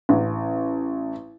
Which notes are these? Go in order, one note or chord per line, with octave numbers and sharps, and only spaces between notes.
A1